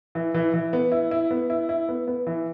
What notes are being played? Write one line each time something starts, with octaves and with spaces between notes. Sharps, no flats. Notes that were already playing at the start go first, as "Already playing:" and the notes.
E3
E3
E3
B3
E4
E4
B3
E4
E4
B3
B3
E3